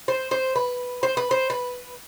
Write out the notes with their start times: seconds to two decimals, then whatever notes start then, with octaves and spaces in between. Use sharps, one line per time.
0.08 C5
0.31 C5
0.56 B4
1.03 C5
1.17 B4
1.31 C5
1.50 B4